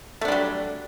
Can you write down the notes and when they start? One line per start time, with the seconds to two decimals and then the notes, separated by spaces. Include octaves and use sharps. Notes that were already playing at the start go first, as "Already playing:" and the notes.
0.21 A3
0.25 D4
0.28 G3
0.32 F#3